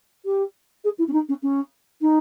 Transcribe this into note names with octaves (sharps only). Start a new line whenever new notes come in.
G4
G#4
E4
C#4
D#4
C#4
C#4
D#4